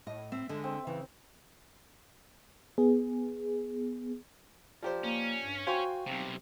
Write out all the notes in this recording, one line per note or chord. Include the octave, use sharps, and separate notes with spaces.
A2 D#5
C4 E5
D3 G#3
C4
C#3 E3
B3 G#4
F3 G4 C5 D5 A#5
A#3 C#4
G2
F#4 C5 F5 G5 G#5 C6 C#6
B1 C3 C4